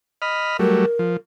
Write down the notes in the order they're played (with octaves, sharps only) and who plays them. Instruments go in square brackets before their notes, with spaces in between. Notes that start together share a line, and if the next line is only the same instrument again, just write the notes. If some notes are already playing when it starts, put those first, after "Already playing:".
[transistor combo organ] D#5 B5 F6
[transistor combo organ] F#3 G3 A3 [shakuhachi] A#4
[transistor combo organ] F3